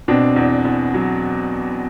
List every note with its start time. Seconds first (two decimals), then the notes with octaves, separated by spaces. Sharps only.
0.08 B2 C4 D4
0.36 E2
0.65 E2
0.94 F#3